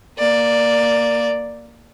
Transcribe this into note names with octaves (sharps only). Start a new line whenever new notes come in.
A#3 D5